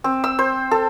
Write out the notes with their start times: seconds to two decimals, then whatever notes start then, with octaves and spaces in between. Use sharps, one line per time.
0.04 C4
0.24 E6
0.39 C5
0.71 A4